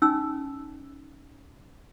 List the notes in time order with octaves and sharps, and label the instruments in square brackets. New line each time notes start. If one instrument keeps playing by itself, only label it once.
[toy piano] C#4 D#4 G#5 E6